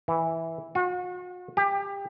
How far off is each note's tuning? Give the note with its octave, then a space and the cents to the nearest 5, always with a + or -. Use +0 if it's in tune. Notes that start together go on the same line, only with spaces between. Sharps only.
E3 -5
F#4 -45
G4 +25